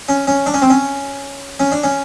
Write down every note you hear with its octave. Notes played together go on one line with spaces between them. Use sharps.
C#4
C#4
D4
C#4
C4
C#4
C#4
D4
C#4